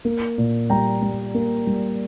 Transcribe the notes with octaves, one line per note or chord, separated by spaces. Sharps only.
A#3
A#2
G3 G5 A#5
G3
A#3
G3